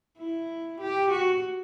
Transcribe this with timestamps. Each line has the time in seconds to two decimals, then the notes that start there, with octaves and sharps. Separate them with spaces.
0.19 E4
0.80 G4
1.11 F#4